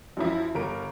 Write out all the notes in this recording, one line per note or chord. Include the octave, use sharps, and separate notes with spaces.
F#2 F3 E4
G1 A#4 D7